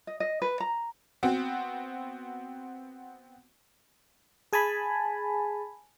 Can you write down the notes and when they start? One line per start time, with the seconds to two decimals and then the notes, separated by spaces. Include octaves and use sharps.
0.07 D#5
0.20 D#5
0.42 B4
0.60 A#5
1.23 B3 C4 F#4
4.53 G#4 G#5 A5 B5